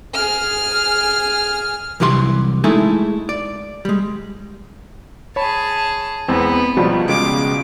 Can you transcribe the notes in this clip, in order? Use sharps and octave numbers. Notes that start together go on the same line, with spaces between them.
G#4 F6
C2 E3 F#3 G4 D#5 C6
G#3 A3 D#4 E4 G#4 A4
D5
G3 G#3
G#4 C#5 A5 B5
E2 G#3 B3 C4
C#2 B2 F3 G3
C#3 G#3 G#4 D6